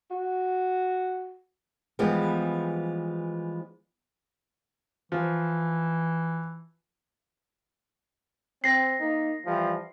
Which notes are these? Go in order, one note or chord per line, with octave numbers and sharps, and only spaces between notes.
F#4
E3 F3 G3 G#3 B3
E3 F3
C4 A#6 C7
A#3 D#4
E3 F3 G3